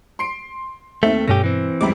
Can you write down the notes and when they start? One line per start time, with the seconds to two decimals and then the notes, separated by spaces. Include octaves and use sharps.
0.19 C6 C7 D7
1.03 D#2 A3 C4 E5
1.28 G2 B2 A3 C#4 G4 A#6
1.44 E3 C4
1.81 C#2 F#2 G3 B5 D6